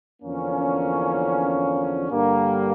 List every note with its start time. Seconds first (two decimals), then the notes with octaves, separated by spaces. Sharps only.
0.22 E2 D3 F3 A#3 C#4
2.11 G2 D3 G3 A#3